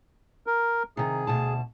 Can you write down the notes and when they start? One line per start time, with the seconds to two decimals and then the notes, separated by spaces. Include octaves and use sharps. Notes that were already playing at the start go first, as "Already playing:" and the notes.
0.47 A#4
0.97 C3 D#3 G#4
1.27 D2 B2 A5